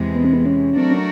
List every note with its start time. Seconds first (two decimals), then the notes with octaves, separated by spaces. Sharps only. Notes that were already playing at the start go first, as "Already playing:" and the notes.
Already playing: E2 C3 E3 G#3
0.15 B3
0.24 C4
0.33 B3
0.46 C#4
0.77 F#3 A3 C4 D4 F#4 A#4
0.91 C#4